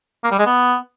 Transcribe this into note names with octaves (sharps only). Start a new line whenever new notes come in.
A#3
G3
G#3
B3